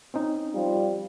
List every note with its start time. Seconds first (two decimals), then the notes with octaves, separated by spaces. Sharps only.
0.14 C4 C#4 D#4
0.55 F3 G3 F4